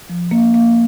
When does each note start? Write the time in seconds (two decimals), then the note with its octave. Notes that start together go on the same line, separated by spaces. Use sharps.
0.10 F3
0.31 A#3
0.54 A#3